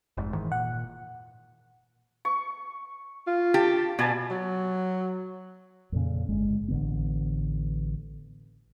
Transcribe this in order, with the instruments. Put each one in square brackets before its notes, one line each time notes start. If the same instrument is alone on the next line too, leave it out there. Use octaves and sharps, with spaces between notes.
[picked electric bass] F1 G#2
G#2 D#3 E3
[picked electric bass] A#2 [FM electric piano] F#5
[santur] C#6
[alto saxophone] F4
[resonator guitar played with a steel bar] G4 [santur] A5
[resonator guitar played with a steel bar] B2 [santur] D5 G#5 A5
[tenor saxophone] F#3
[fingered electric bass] F2 A#2 C#3
G1 G#3
A1 D3 B3